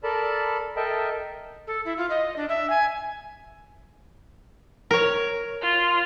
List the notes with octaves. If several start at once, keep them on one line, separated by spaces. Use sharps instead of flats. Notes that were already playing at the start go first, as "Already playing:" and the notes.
A4 A#4 D5 A5 B5
A4 A#4 D#5 E5 G5 A5
A4
E4
F4
D#5
D4
E5
G#5
A#4 C#5
F4